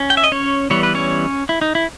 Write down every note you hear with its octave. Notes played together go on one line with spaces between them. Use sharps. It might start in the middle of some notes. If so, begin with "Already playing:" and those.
Already playing: C#4
G5
E5
D#5
C#4 C#5
E3 G3 B3 C#5
B4
C#4 C#5
E4
D#4
E4